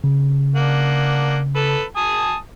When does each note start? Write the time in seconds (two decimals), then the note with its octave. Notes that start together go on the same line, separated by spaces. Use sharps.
0.04 C#3
0.56 A#3 D4 F#5
1.56 A4 B4
1.97 G#5 A5 D#6